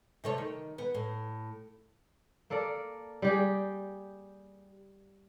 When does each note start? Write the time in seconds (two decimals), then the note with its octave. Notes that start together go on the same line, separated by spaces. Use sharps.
0.24 C3 A3 C#5
0.38 D#3
0.78 B3
0.94 A2
2.50 A#3 A4 A#4 D5
3.22 G3 G4 G#4